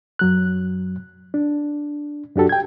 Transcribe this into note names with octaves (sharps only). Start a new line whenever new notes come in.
F#2 F#3 F#6
D4
F#2 D4 F#4 G4 A4
G5 G#6